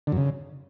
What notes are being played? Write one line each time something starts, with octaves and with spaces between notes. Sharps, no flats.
D3
F#2
C#3